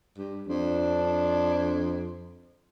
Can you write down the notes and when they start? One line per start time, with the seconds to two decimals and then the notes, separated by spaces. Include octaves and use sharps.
0.18 G2
0.48 F2 D4